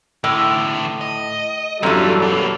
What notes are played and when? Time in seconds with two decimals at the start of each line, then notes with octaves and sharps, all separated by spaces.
0.24 A2 D3 E3
1.01 D#5
1.83 F#2 E3 F#3 G3 D4 F4 A4
2.22 B2 A#3